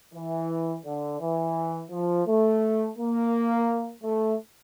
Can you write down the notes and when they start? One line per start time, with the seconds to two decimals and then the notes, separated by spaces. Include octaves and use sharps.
0.14 E3
0.85 D3
1.20 E3
1.91 F3
2.27 A3
2.98 A#3
4.03 A3